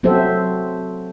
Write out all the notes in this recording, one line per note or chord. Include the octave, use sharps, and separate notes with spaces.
F#3 C4 F#4 A4 C5 E5